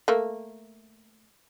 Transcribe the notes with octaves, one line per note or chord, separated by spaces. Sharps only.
A3 A#3